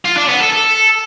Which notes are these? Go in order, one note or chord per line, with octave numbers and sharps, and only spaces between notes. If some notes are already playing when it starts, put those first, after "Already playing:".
F4
D4
B3
A4
A4